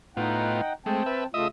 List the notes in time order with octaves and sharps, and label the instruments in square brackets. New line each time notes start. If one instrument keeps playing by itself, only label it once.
[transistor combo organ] A2 B3 F4 [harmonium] D#4 F#5 G5
[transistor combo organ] G#3 A3 [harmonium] C4 G5 A5
[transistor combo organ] B4 E5
[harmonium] C#3 A3 F4 [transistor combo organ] D#5 E5 D#6